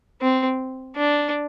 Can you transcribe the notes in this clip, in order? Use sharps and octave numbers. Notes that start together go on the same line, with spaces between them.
C4
D4